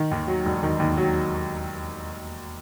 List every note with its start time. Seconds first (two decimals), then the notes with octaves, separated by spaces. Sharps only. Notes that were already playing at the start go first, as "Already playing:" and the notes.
Already playing: D#3
0.11 D#2
0.28 F#3
0.45 E1
0.63 D#3
0.80 D#2
0.97 F#3